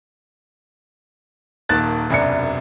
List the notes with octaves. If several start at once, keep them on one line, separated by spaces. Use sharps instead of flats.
D#1 D#3 A#3 A5 F#6 A6
E1 C2 F#2 D4 C#7